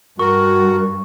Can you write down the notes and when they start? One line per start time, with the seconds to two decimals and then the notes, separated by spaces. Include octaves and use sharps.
0.19 G2 F#4 A#4 C#6